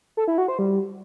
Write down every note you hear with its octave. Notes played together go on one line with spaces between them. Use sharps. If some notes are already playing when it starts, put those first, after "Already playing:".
A4
E4
F#4
C5
G3